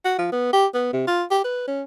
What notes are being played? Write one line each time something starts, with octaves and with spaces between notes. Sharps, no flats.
F#4
F3
B3
G4
B3
C3
F4
G4
B4
C#4